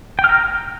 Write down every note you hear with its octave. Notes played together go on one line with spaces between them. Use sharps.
G5
F6
A#5